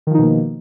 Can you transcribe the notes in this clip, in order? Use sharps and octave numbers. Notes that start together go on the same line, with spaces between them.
B2 D#3 F3 A#3 D#4